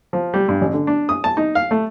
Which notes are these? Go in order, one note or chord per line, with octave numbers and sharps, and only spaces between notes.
F3
G3
G2
A1
D3
D4
D#6
A5
D#4
F5
A3